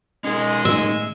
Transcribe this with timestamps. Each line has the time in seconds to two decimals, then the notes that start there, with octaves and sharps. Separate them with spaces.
0.24 G#3 C#4 D#4 A#4
0.65 A2 D#3 E5